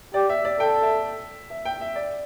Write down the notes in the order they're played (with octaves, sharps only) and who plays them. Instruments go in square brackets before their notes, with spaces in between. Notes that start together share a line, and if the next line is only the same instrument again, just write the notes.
[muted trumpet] G4 [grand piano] D5
[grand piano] E5
D5
[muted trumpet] A4 [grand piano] G5
[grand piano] E5
E5
G5
E5
D5